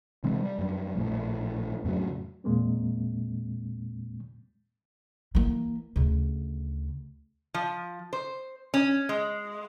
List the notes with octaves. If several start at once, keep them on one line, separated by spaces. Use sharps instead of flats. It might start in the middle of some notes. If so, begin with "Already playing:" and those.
C3 E3 G#3 C4
G3
F#2 G3
A#1 A2
F2 A2 C#3 F#3
E2 A#2 G#3 A#3 C4
E3 A#3
D2 C#3
F3
C5
C#4
G#3